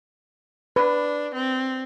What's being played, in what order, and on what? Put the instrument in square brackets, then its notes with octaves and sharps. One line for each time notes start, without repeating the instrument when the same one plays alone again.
[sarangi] D4 [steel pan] B4
[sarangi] C4